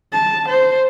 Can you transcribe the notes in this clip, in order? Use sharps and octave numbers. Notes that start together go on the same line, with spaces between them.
A5
C5